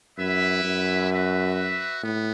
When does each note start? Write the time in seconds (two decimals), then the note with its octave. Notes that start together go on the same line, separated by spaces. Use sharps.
0.18 F#2 E4 B4 E5
0.64 F#2
1.10 F#4 B4 E5
2.03 A2 B3